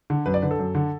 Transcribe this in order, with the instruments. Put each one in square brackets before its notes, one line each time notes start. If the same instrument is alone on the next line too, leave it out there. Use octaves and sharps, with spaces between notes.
[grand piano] D3
F#2 B4
D5
D3 B4
A4
F#2
D3